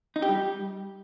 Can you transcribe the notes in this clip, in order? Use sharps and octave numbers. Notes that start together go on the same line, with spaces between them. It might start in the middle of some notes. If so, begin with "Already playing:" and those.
D#4
G4
G3